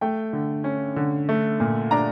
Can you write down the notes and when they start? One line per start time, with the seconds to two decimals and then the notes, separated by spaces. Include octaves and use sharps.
0.01 A3 G5
0.33 D3
0.64 C#4
0.96 D3
1.29 A3
1.60 A#2
1.91 D4 A#5